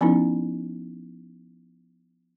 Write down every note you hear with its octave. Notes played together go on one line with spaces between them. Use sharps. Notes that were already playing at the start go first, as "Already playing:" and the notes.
F3 B3 C#4 D#4 E4